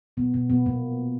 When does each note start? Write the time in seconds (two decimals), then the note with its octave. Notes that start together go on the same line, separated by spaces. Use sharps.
0.17 B2 B3
0.34 B2 B3
0.50 B2 B3
0.66 A#2 A#3